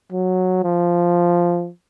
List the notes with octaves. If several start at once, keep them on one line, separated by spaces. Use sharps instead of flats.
F#3
F3